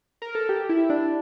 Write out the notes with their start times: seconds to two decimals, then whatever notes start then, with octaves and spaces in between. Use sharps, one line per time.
0.22 A#4
0.35 A4
0.49 G4
0.69 E4
0.90 D4